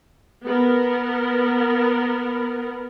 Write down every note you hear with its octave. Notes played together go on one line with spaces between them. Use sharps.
B3 A#4